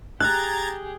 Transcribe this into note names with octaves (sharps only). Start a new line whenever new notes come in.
G4 G#4 A#5 F#6 G#6 A6